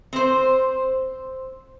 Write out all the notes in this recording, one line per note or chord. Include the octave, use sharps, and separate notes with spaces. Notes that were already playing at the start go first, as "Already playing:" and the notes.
C4 C5